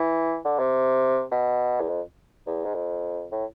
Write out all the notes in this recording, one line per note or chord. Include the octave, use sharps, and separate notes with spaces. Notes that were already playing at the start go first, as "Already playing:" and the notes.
Already playing: E3
D3
C3
B2
E2
F2
E2
G#2
F2
A2